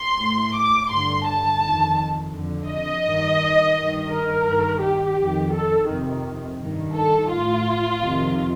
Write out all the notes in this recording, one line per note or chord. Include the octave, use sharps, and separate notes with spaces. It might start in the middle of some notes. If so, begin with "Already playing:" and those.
Already playing: C6
A2
D6
G2 D3 C6
A5
F2 D#3
F2 D3
D#5
G2 D#3
G2 D#3
A#4
G2 D#3
G4
F2 D#3
A4
F2 C3 D#3
G2 D#3
A4
A2 F4
F2 C3 D#3